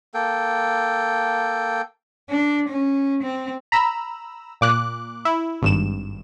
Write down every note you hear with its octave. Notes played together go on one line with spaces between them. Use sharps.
A#3 A4 G5
D4
C#4
C4
A#5 B5 E6
A#2 D6 F#6
E4
G#1 G2 E7